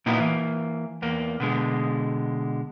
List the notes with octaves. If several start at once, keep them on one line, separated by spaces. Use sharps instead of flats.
A#2 A#3 B3 D#4 E4 F#4
E3 A#3
E2 A#3
B2 D3 G#3